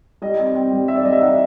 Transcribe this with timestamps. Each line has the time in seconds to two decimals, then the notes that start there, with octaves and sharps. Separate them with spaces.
0.22 G3 D#5
0.39 C4
0.55 C4
0.72 G3
0.88 C4 E5
0.96 D5
1.05 G3 D#5
1.13 E5
1.21 D#4 F#5